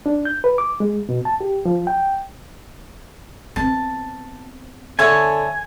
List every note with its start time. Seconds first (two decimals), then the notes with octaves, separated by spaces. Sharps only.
0.06 D4
0.25 G6
0.44 B4
0.58 D6
0.80 G#3
1.09 B2
1.25 A5
1.41 G4
1.65 F3
1.87 G5
3.56 B3 C4 A5
4.99 D3 C#5 E5 G#5 A5